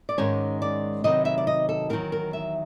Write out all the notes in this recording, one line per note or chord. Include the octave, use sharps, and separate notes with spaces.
D5
G#2 D#3 G#3 C#4 C#5
D5
C3 D#3 F#3 B3 D#4 D#5
E5
D5
D#5
A4
E2 C3 D#3 F#3 A#4
A#4
E5